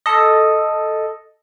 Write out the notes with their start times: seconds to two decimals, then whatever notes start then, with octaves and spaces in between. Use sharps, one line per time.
0.06 A4 D#5